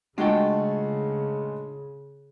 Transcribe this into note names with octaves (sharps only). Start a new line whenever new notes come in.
C#3 G#3 A3 D4 F4 F#4 G5